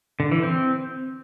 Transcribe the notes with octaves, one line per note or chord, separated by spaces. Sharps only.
D3
E3
C4